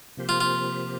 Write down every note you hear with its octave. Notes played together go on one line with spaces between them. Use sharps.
C3 F3 A#3 G4 C5
F4
F4